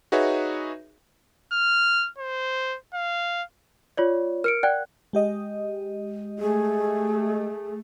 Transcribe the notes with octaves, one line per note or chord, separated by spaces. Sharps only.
D#4 F#4 G#4 B4 C#5 E5
F6
C5
F5
F4 C#5 D5
A#4 F6 C#7 D7
D5 F#5 G5 F#6
G#3 G4 D#5
A3 G#4